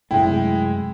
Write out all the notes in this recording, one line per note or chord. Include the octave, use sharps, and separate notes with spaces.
F#2 C3 G#3 A3 E4 G5